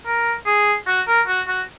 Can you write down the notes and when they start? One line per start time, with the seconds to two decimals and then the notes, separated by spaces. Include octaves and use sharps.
0.06 A#4
0.46 G#4
0.87 F#4
1.07 A#4
1.27 F#4
1.48 F#4